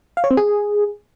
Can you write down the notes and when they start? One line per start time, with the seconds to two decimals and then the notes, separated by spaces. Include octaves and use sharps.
0.17 F5
0.24 C#5
0.31 C4
0.37 G#4